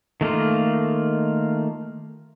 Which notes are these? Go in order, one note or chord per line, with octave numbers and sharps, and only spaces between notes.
D#3 A3 A#3 F4